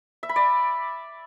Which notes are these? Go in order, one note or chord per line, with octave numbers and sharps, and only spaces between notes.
E5
B5
D5